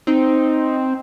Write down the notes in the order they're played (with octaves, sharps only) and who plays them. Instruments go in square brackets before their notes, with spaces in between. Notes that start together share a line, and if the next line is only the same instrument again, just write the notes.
[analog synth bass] C4 [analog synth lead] D#4